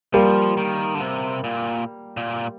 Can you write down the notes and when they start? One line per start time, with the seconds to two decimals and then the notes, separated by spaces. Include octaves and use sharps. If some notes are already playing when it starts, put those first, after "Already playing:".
0.14 F3 G3 A#3
0.57 D#3
0.95 D3
1.01 C3
1.44 A#2
2.17 A#2